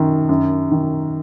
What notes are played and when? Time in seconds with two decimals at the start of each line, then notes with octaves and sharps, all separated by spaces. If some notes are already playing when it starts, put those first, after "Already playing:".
Already playing: F#2 D#3
0.29 F#2
0.71 D#3